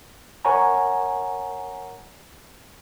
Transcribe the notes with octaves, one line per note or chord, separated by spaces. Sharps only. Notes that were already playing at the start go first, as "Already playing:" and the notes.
A#4 C#5 F#5 G#5 A#5